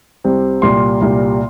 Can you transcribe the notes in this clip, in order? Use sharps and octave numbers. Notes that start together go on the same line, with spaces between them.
C2 C3 G3 C4
C2 A#2 G3 C6
C2 A#2 G3